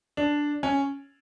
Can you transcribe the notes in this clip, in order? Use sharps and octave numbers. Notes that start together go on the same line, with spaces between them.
D4
C#4